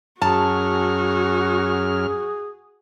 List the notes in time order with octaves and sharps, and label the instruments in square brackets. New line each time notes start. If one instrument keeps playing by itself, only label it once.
[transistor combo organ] F#2 F6 [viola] F#4 [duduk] G#4 [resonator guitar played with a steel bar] A5